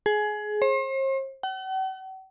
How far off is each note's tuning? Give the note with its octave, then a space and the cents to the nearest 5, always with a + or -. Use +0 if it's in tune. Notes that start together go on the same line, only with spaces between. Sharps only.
G#4 +20
C5 +40
F#5 +45